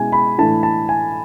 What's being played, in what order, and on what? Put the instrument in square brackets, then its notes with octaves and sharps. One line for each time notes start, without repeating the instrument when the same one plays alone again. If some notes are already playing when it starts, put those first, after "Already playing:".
Already playing: [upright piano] B2 G#3 C#4 E4 [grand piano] G#5
[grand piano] B5
[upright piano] A2 E3 A3 D4 [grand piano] A5
[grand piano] A5
G#5